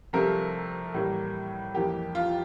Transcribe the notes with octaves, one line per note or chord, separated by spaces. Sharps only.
C2 C3 F3 A3 A#4
A2 E3 G3 A#3
F2 E3 A#3 G4
F4